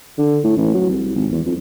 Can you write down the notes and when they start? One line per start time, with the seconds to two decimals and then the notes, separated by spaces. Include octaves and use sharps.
0.19 D3
0.44 A2
0.57 A1
0.74 F#3
0.90 C2
1.16 G#1
1.32 E2
1.46 F2